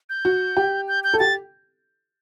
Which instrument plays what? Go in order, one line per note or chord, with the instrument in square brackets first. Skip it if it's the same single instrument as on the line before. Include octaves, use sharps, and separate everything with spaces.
[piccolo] G6
[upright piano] F#4
G4
[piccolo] G6
G6
[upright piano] A4
[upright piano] G4 [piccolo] A6